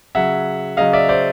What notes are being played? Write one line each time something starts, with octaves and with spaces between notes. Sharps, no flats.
C#3 F#3 E5 F#5
C#3 F#3 D#5 F5
D5 E5
C5 D5